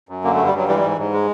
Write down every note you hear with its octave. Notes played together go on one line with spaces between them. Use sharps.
F#2
D3 A#3
A3
G2
G3
G2 F#3
E3 G3
G#3
G3
G#2
G#2
G#3